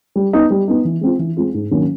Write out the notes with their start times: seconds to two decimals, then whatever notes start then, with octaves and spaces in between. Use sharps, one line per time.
0.16 G3
0.33 B3 D#4
0.50 G3
0.68 B3 D#4
0.85 E3
1.01 G#3 C4 F4
1.19 E3
1.37 G#3 C4 F4
1.54 G#2
1.71 D#3 F#3 A#3 C#4